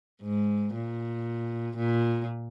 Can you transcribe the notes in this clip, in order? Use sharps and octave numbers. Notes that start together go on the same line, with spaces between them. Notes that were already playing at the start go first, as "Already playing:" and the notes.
G#2
A#2
A#2